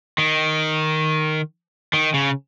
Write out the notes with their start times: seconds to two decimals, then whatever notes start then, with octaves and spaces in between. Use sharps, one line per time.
0.18 D#3
1.93 D#3
2.14 C#3